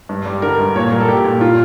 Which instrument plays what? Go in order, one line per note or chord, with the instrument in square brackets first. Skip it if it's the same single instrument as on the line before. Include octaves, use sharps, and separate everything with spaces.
[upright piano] G2
G3
D3 A#4
G2
A#2 C#5
G3 A#4
A4
A#2 G4
A#2
A#2 F4